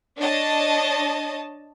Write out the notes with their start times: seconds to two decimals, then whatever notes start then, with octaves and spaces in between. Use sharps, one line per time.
0.18 D4 C#5 D#5 A5